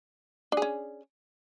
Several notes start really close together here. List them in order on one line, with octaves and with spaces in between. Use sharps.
D4 G#4 C#4